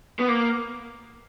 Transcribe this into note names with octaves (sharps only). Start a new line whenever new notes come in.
B3
A#3